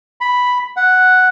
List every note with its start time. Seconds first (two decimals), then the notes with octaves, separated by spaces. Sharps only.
0.21 B5
0.77 F#5